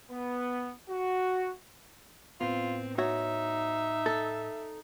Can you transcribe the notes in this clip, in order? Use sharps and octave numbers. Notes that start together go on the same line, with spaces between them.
B3
F#4
A2 B3 C4 F4
D#4 F#4 C#5 E5
A4